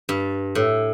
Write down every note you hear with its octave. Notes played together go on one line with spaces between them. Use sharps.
G2
A2